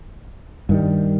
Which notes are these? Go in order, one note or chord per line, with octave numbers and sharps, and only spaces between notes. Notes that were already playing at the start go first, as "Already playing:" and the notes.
G2 D#3 G3